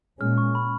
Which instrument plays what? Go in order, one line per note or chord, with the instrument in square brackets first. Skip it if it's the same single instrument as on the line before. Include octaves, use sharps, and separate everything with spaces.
[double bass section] A#2 G#3 C#4 [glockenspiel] F6
[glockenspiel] C#6
B5